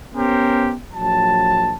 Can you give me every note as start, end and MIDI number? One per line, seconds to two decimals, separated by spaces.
0.15 0.74 59
0.15 0.74 61
0.15 0.74 67
0.15 0.74 70
0.15 0.74 72
0.94 1.75 34
0.94 1.75 54
0.94 1.75 81